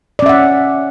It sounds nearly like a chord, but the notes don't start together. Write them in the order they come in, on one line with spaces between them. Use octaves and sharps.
D5 C#4 E5 F#5